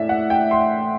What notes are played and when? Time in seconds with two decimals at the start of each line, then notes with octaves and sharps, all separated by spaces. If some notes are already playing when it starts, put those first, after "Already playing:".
Already playing: A2 E3 D5 E5
0.09 F#5
0.30 G5
0.51 C6